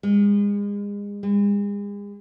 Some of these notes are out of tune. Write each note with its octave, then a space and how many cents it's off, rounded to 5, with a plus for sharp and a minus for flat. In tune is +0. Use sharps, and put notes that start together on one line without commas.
G#3 -35
G#3 -40